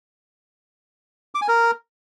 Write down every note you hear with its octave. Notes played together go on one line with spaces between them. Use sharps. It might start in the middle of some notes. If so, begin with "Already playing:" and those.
D6
G#5
A#4